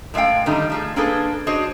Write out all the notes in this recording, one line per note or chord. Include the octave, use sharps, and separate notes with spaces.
A2 G#3 E5 F5 G5
D3 D#3 G3 A3 D#4
F3 A3 G#4
A#3 C4 D4 G#4 A4 B4
D4 F#4 G#4 C5 C#5 D#5